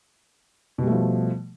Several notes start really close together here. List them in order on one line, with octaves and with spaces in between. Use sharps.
B2 G3 A3 F3